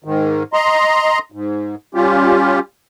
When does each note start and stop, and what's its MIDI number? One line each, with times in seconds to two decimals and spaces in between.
0.04 0.43 44
0.04 0.43 51
0.53 1.19 75
0.53 1.19 82
0.53 1.19 84
1.32 1.75 44
1.95 2.59 55
1.95 2.59 61
1.95 2.59 65
1.95 2.59 67